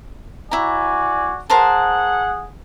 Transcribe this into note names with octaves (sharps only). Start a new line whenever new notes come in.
E4 F#4 D5 G#5 A#5
G#4 A#4 C5 F#5 A5